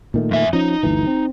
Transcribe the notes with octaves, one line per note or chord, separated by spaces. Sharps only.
A#2 D#3 A3
F2 E5 G#5
F3 C#4 D#4
G1 D2 E3
C4